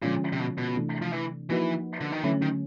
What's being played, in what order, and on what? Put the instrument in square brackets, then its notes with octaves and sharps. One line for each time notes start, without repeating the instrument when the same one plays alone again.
[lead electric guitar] A#2 [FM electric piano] D3 F3 G#3 C#4 F4
[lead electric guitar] C3
B2
B2
[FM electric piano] C3 E3 A3 D4
[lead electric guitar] F3
E3
[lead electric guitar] E3 [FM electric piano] F3 A#3 D#4 F#4 B4
[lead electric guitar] D3
D#3
[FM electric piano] D3 F#3 A3 C#4 [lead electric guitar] E3
[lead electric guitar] D#3